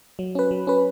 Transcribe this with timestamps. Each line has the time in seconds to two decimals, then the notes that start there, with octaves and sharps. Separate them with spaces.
0.19 F#3
0.35 C#4 B4
0.51 F#3
0.67 C#4 B4